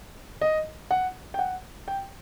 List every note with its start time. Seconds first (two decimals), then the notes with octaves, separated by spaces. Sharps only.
0.41 D#5
0.91 F#5
1.34 G5
1.39 F#5
1.88 G5